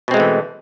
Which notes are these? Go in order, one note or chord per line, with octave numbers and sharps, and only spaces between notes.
B2 E3 G#3 A3 C4